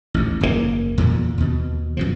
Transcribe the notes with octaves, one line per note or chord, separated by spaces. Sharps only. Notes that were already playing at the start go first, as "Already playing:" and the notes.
A1 D#2
F#1 E2 A#2 A#3
E2 A#2 D3
D#2 B2
F#2 B2 F3